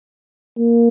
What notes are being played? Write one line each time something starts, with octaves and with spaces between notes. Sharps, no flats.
A#3